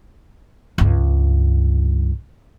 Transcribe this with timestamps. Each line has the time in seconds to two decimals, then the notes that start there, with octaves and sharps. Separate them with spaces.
0.78 C#2 G2